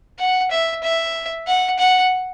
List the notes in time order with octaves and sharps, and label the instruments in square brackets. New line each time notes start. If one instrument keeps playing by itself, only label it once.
[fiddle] F#5
E5
E5
F#5
F#5